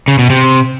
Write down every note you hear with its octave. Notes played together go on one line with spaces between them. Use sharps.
C#3
B2
C3